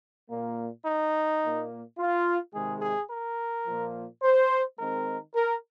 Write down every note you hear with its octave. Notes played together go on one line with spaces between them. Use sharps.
A#2 A#3
D#4
A#2 A#3
F4
C3 D#3 G#3 G#4
G#4
A#4
A#2 F3 A#3
C5
D#3 G#3 C4 A#4
A#4